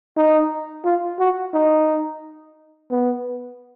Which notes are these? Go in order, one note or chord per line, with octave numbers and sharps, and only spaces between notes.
D#4
F4
F#4
D#4
B3